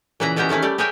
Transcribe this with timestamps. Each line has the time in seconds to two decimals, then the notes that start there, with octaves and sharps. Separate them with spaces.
0.20 A#2 C#3 E3 E4 B4 A#5
0.36 B2 B3 C#4 G4 E5 A#5
0.49 D#3 A3 C#4 E4 F5
0.62 G3 A3 D5
0.78 G4 G#4 A#4 C#5 E5 G5